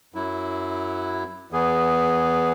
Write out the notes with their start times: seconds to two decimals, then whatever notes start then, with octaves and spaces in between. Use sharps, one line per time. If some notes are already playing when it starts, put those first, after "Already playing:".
0.14 F#2 F#3 E4
1.51 E2 E3 B3 G#4